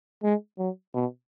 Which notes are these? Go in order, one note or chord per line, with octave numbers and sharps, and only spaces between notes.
G#3
F#3
B2